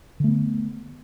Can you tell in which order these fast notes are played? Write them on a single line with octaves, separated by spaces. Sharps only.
D3 A3 B3